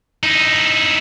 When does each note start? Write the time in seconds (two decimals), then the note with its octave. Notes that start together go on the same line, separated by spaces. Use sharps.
0.23 D#4 E4